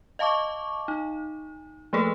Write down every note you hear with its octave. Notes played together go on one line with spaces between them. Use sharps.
D#5 F5 A5 C#6 D6
D#4
F3 A3 A#3 G#4 A4 B4